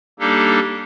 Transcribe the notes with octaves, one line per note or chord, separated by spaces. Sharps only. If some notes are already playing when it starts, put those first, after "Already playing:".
G3 A#3 D4 D#4 G4 A4